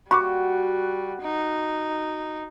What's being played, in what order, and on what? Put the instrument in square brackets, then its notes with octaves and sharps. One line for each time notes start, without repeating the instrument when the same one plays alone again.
[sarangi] G3 [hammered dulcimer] F#4 [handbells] B5 C#6 D6
[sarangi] D#4